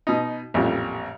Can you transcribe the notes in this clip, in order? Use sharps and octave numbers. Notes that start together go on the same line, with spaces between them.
B2 D#4
A1 F2 A#2 G3